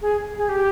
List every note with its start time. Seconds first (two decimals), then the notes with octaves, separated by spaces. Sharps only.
0.02 G#4
0.38 G#4
0.49 G4